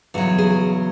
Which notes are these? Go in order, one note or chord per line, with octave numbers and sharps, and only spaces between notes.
E2 C#3 F#3 F#4
G#4